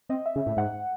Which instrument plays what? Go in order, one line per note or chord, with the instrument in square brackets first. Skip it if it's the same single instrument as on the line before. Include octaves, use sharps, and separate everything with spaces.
[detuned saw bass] C4 [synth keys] D#5
[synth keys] E5
[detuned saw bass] C#3
A2
[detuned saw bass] G#2 [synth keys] F#5